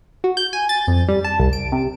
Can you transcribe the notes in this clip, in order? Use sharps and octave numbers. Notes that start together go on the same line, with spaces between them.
F#4
G6
G#5
A6
F2
G3
A5
C2
D7
C3